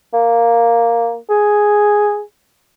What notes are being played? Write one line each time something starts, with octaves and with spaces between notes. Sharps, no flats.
A#3
G#4